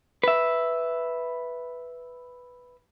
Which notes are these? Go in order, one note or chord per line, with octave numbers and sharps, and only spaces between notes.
B4 E5